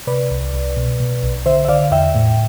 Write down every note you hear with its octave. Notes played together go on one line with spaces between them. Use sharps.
C3 B4 D5
C2
C2
B2
B2
B1
D3 C5 E5
E5
D3 D5 F5
E2 E5 G5
A2